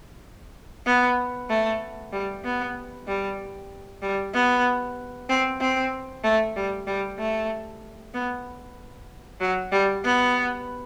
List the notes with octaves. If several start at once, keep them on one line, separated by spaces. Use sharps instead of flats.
B3
A3
G3
B3
G3
G3
B3
C4
C4
A3
G3
G3
A3
B3
F#3
G3
B3